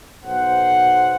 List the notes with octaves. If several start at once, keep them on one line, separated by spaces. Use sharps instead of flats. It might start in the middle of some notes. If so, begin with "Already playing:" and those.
B1 C5 F#5